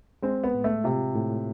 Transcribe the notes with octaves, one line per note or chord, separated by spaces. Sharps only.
G#3 C4
B3
A2
A3
C3 F4
A2